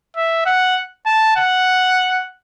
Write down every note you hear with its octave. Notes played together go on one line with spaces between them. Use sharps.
E5
F#5
A5
F#5